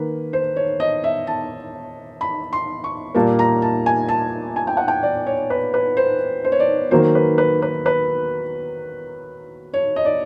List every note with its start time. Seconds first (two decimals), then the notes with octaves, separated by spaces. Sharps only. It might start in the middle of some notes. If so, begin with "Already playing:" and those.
Already playing: D#3 A#3 B4
0.33 C5
0.56 C#5
0.80 D#5
1.04 E5
1.27 A5
2.21 B5
2.53 C6
2.84 C#6
3.14 A#2 G3 A#3 A5
3.39 A#5
3.62 A5
3.86 G#5
4.09 A5
4.56 G#5
4.67 G5
4.77 F#5
4.88 G5
5.03 D5
5.26 C#5
5.50 B4
5.74 B4
5.97 C5
6.45 C5
6.52 C#5
6.60 D5
6.91 D#3 F#3 A#3 C5
7.15 B4
7.38 B4
7.62 B4
7.86 B4
9.74 C#5
9.96 D#5
10.05 D5